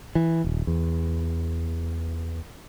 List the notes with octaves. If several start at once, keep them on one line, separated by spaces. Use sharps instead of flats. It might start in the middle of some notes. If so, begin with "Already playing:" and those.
E3
D#1
E2